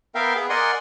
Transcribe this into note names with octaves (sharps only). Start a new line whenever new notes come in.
B3 A#4 E5 F5 G5
B3 G#4
A#4 D5 D#5 F#5 G#5 C6